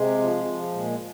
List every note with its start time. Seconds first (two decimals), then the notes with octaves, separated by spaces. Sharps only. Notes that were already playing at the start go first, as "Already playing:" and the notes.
Already playing: C3 G#3
0.18 F3
0.45 F3
0.71 A#2 G#3